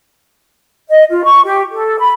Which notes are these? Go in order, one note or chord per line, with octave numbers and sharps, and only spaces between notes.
D#5
F4
C#6
G4
A4
B5